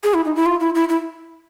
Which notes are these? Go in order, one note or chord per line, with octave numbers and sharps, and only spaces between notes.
G#4
E4
D#4
E4
F4
E4
E4
E4